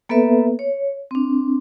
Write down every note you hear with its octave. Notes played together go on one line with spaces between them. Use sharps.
A#3 B3 A4 B4 E5
C#5
C4 D4